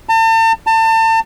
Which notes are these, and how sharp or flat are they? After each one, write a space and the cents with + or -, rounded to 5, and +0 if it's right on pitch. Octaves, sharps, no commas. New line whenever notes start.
A5 +40
A5 +35